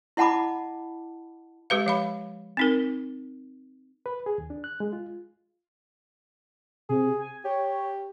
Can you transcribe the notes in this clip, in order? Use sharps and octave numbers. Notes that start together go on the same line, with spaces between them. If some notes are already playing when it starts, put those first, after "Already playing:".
E4 D#5 F#5 A5 B5 D6
G#3 G4 B4 F5
F3 F5 B5
C4 D#4 A#4
B4
G#4
D#2
D4
F#6
G#3
F4
C3 G#4
G#5
G4 C#5